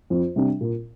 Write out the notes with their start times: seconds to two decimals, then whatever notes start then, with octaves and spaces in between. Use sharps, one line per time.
0.10 F2
0.36 C3 G3 D4
0.61 A#2